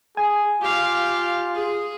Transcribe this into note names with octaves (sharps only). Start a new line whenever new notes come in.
G#4 G#5
F4 G4 F5
G#4